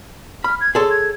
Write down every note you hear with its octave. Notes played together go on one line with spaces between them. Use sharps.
B5 F6
G#6
G#4 A4 C#5 C6
G#6